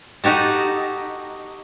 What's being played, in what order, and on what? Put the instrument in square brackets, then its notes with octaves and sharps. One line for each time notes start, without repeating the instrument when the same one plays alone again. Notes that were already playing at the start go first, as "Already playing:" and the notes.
[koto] D#4 F#4 G4 A4